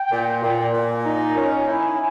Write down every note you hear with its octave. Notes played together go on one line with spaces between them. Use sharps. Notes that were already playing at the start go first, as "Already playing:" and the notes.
Already playing: G5
A#2
A#2
A#2 G#5
D#4
C#4
E4